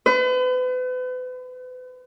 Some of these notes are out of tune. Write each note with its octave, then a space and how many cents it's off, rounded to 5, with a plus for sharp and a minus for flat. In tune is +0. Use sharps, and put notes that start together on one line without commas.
B4 +40